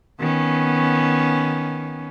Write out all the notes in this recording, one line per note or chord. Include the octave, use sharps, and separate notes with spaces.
D#3 B3 C#4